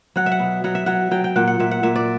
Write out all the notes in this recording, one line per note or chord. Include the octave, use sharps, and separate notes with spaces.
F#3 F#5
E5
F#5
B2
F#3 F#5
E5
F#3 F#5
F#3 G5
G5
A#2 F#5
F#5
A#2 E5
F#5
A#2 E5
D5